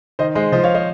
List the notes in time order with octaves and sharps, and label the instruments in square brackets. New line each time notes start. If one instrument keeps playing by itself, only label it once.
[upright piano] D#3 [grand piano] C5 D#5
[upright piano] G#3 [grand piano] C5 D#5
[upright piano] F3 [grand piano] C5 D#5
[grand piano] C#5 F5
C5 D#5